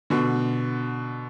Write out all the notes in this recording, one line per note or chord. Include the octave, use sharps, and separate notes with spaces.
B2 D3